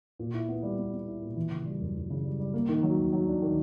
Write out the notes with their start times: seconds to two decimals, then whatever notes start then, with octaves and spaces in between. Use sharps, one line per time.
0.19 A#2
0.34 E4
0.48 B3
0.63 G3
0.78 B3
0.93 B3
1.08 E4
1.22 A#2
1.36 E3
1.52 C#3
1.66 G3
1.81 F#2
1.95 F#2
2.10 C#3
2.25 G3
2.40 G3
2.54 A#3
2.69 D#3
2.83 F#3
2.97 F#3
3.13 F#3
3.27 D4
3.42 D#3